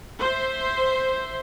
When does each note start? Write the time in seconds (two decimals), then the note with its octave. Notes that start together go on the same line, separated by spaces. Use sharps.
0.19 C5 E5